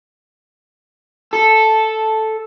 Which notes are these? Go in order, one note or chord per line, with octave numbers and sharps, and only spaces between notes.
A4